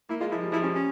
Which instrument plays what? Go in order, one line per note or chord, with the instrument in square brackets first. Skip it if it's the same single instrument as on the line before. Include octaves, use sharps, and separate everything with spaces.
[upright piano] A#3 [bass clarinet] E4
[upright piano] G#3 [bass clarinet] F4
[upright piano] F3 [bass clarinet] E4
[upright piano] G3
[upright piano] F3 [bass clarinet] E4
[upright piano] G3 [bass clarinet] C#4
[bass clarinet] C#4